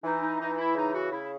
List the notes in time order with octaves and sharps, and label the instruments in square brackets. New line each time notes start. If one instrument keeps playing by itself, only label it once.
[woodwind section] E3 D#4
D#4
E3 D#4
D#4
E4
C#3 D#4
F#4
C#3 E4